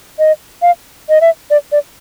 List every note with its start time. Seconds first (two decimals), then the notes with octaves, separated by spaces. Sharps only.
0.19 D#5
0.62 F5
1.09 D#5
1.21 E5
1.50 D5
1.72 D5